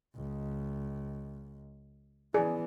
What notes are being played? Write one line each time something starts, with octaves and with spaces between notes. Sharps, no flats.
C#2
E3 B3 G#4 D5